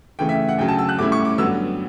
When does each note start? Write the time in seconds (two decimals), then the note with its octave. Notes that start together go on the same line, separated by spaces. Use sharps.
0.19 C#3 E3 A3 G5
0.29 E5
0.49 F#5
0.58 D2 C#3 F#3 G5
0.68 A5
0.79 E6
0.89 F#6
0.98 A2 G3 C#4 E4 D6
1.12 C#6
1.25 D6
1.38 G2 D3 F#3 B3 E6